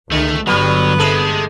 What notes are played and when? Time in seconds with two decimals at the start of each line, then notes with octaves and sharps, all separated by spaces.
0.12 C#2 D3 A3
0.47 G1 D3 F#3 G3 B3
1.00 C3 G#3 A4